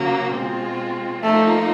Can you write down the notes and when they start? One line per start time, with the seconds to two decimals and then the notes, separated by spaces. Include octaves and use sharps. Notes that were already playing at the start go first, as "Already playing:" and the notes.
Already playing: C#3 F#3 A#3
0.35 B2 G#3 C4 F4
1.22 F3 A3 A#3 D#4